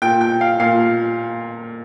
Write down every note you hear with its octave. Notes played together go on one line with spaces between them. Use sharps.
A#2 G5
G5
F5
A#2 F5